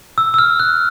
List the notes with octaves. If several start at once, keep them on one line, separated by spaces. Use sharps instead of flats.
E6
E6
F6
F#6